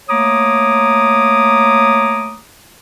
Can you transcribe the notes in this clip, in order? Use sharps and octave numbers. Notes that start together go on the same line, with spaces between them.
A3 A#3 C#5 A#5 D6 D#6